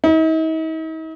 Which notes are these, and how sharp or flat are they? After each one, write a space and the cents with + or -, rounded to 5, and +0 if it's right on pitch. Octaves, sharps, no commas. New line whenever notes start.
D#4 +45